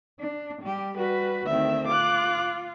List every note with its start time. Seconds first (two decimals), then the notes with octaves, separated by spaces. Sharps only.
0.20 D4
0.62 G3 G4
0.97 G3 F#4 B4
1.46 D2 D#3 C4 E5
1.88 F4 D6 F#6